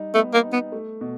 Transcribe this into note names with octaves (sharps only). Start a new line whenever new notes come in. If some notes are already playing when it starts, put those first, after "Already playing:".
Already playing: G3 D#4
A3 B3
A#3
D#4
B3
A3
B2